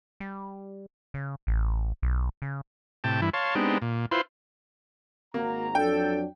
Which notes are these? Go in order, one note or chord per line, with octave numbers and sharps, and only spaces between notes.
G3
C#3
A1
B1
C#3
A2 C3 G5 A5
G2 E3 E4
C#5 F5 A5 C6
G#3 B3 C4 D4 D#4 G4
A#2
E4 F4 B4 C5 C6
G#1 A#3 F#4 A#5
F2 F#3 D4 A4 G5